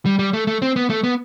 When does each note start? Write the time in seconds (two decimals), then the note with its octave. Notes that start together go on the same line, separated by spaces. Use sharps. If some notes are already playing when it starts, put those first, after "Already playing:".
0.05 G3
0.19 G3
0.33 A3
0.47 A3
0.62 C4
0.76 B3
0.90 A3
1.04 B3